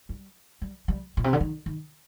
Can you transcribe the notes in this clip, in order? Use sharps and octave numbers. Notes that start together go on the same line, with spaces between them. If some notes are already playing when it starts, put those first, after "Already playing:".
G3
G3
G3
A#2
C3
D3
D#3
D#3